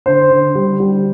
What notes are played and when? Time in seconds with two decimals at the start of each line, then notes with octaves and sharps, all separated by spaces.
0.06 D3 C5
0.30 D3
0.55 G3
0.80 G3